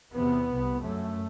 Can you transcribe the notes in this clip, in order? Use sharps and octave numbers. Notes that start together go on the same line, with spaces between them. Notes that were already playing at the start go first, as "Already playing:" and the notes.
E2 C3 B3
C2 C3
F#2 A3